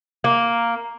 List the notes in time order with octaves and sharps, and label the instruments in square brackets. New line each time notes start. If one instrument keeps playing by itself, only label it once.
[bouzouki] A#3